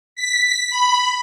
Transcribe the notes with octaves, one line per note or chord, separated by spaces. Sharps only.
B6
B5